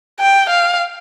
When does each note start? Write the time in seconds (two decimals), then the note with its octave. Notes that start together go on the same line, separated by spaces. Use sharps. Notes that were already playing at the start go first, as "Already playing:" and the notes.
0.20 G5
0.50 F5